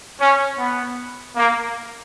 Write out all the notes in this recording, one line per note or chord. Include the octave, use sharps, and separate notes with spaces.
C#4
B3
A#3